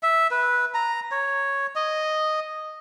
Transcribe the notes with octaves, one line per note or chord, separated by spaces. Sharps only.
E5
B4
A#5
C#5
D#5